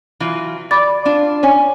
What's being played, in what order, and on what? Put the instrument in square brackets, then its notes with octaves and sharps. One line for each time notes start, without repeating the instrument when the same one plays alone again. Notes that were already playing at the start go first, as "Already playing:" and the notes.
[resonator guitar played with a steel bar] E3 F#3 F4
[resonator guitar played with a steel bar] D5 [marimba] B5 D6 A6
[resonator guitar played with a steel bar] D4 F4
[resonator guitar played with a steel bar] C#4 [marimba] C#5 G#5